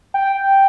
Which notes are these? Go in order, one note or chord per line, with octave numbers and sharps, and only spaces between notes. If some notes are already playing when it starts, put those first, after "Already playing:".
G5